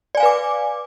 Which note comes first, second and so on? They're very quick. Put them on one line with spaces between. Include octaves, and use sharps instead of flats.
D5 G#5 F5 B4 D6